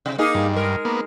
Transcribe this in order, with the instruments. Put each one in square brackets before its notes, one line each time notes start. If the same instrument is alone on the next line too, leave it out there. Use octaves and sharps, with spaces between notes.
[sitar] C3
A#3 D#4 G#4
[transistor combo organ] G2
[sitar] G#3 A#4
[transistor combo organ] A#3 B3